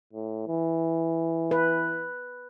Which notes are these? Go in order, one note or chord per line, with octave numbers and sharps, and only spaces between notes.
A2
E3
B4